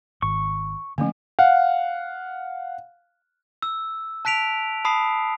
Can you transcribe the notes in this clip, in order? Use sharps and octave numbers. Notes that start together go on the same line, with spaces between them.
G#1 C#6
D3 F3 A3 A#3 C#4
F5 F#5
E6
A5 F#6 B6 D7 F7
A5 B5 D#6 C7